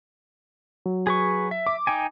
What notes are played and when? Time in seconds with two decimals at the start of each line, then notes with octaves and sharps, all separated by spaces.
0.86 F#3
1.07 G#4 B4 C#6
1.51 E5
1.67 D6
1.87 D#4 G5 G#5